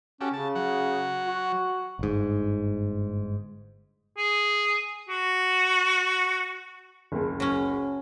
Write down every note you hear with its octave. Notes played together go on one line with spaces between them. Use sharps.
C#4 F#4 G4 A4
C#3 A5
F#3 F#5
F#4
G1 G#2
G#4
F#4
F#1 C#2
F#3 C#4